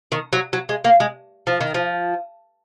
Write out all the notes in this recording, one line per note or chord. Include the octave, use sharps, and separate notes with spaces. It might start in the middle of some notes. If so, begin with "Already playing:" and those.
D#3
F#3
F#3
G#3
A#3
G#3
F3
D#3
F3